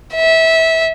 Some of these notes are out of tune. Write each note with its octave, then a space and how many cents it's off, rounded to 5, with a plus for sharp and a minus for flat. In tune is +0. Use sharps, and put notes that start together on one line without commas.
E5 -20